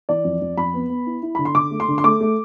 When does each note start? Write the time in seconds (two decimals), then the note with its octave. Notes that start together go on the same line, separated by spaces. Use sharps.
0.09 E3 D5
0.24 F2
0.41 F2
0.57 F2 B5
0.74 B3
0.90 B3
1.06 E4
1.23 E4
1.35 D3 B5
1.45 C6
1.55 D3 D6
1.71 A3
1.80 C6
1.88 D3
1.98 C6
2.04 A3 D6
2.21 A3